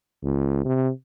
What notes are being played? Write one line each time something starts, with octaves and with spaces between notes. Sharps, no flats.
C#2
C3